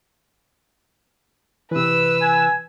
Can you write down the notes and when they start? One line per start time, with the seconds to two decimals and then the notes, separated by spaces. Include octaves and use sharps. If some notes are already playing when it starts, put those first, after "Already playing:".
1.71 C3 E3 B4 E6
2.22 G#5